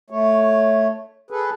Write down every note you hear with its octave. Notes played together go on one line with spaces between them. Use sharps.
A3 C#5
G#4 A4 B4